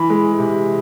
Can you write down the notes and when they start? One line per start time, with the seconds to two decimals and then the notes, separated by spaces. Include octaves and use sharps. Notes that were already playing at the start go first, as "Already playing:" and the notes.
Already playing: E3 B5
0.10 G#3
0.39 C3